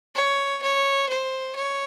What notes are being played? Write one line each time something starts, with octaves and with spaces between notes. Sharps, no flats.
C#5
C#5
C5
C#5